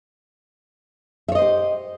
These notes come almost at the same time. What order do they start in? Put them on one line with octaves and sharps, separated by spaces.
E5 C#5 D#5 C5 G4